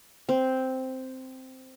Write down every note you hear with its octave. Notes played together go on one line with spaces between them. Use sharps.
C4